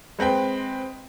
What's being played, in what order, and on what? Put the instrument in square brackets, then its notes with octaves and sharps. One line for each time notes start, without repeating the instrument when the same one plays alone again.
[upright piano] G#3 C4 B4 G5